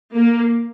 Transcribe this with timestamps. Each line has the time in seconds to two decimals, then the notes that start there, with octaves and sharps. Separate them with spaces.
0.14 A#3